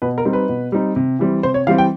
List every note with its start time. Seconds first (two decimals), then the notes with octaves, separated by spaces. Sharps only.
0.02 B2 B4
0.18 A#4
0.25 G3 C4 D#4
0.33 B4
0.49 B2
0.72 G3 C4 D#4
0.96 C3
1.19 E3 G3 C4
1.43 C3 C5
1.54 C#5
1.67 E3 G3 C4 F5
1.78 G5